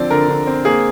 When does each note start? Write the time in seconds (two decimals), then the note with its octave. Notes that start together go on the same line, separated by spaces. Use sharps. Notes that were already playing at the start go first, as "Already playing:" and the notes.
Already playing: D3 F3 C4 D5
0.10 D3 A#4
0.28 D3
0.47 C4
0.65 A#3 G#4